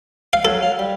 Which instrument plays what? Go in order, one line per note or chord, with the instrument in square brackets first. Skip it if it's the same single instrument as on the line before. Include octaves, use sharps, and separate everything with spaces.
[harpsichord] F5
[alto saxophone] F#3 [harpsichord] A4
[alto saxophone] F5
G3